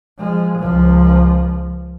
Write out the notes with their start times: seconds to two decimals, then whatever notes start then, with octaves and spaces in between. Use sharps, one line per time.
0.19 F3 G#3
0.60 C#2 F3